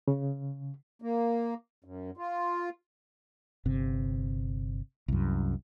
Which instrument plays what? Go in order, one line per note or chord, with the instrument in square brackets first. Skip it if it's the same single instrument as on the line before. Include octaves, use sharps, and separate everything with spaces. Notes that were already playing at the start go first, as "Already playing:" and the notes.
[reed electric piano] C#3
[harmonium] A#3
F#2
F4
[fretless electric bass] G1 C3
C2 F#2